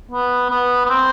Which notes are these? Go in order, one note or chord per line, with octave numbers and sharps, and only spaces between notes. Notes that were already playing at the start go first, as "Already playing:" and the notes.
B3
B3
B3
C4